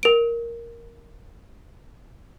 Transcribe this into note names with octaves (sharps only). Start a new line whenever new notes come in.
A#4 D7